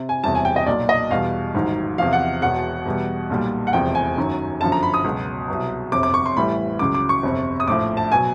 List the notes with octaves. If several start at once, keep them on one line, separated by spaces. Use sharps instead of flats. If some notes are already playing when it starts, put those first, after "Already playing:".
Already playing: C3
G#5
E1 E2 C3 E3 G3 A5
G#5
G5
D#5
B1 A#2 F#3 D5
D#5
E2 B2 G3 F5
A1 G#2 D#3 F#3
E2 C3 F3 F5
F#5
E1 E2 B2 F#5
E2 B2 G3
B1 A#2 G3
F#5
F1 E2 C3 F3 G5
G#5
G1 F#2 D#3 F#3
G1 F#2 D3 F3 A5
A#5
B5
D#6
C#2 B2 F#3
C2 B2 F#3
G1 F2 C3 D6
D6
C#6
C6
A1 A2 E3 G3 B5
C#2 C#3 F#3 D6
D6
C#6
G1 F2 C3
D#6
A#1 A2 F3 D6
A5
B2 F#3 G#5